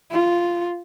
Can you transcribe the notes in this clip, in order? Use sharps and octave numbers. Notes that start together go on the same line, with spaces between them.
F4